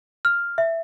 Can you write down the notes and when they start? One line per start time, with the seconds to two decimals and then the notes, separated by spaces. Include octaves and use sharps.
0.25 F6
0.58 E5